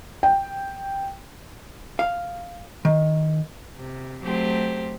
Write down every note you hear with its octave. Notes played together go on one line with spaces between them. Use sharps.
G5
F5
D#3
C3
F#3 A3 C4 G4 C5